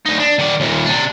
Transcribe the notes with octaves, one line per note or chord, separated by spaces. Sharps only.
D2 D#4
D4
D#3 D5
D#2 A#2
C3 D4